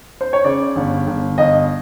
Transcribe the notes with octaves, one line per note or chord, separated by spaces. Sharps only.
C5
C#5
C#3 D5
G1
G1
G1 D#5